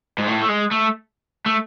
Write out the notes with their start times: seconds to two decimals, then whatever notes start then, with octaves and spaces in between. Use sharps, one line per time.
0.18 G#2
0.27 A2
0.42 A3
0.49 G#3
0.71 A3
1.46 A3